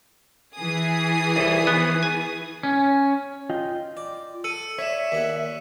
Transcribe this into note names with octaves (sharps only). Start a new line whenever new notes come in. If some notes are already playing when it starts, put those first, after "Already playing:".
E3 G#4 D#6
C2 A4
B3
G#5
C#4
F4 D#5 G5
D5
A4 E6 C#7 D#7
C#5 D5 E5 B6 C#7 E7
D#2 E4 F#5